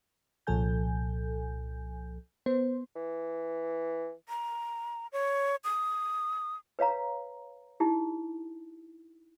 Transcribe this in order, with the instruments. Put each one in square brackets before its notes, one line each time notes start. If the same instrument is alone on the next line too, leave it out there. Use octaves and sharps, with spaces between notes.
[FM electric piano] C2 A#2 F3 A4 G#5 G6
B3 C5
[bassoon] E3
[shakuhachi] A#5
C#5
D#6
[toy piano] B4 C#5 F5 A#5
D#4 E4 G4